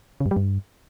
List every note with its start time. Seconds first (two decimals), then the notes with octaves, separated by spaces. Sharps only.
0.20 C#3
0.26 G2
0.31 G3
0.37 G2